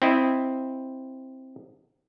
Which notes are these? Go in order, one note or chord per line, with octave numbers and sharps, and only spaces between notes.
C4 E4 D#5